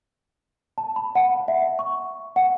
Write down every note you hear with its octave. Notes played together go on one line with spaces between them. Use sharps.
A5
B5
F#5
E5
C#6
F#5